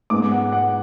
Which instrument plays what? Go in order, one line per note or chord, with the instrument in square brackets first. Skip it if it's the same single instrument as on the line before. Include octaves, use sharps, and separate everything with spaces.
[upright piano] G#2 G#3 B3 [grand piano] D6
[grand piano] F#5
F#5